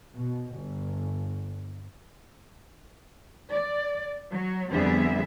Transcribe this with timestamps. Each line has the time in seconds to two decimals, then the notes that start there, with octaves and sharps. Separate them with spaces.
0.16 B2
0.53 G1
3.50 D5
4.30 F#3
4.69 F2 D3 G3 B3 G#4 E5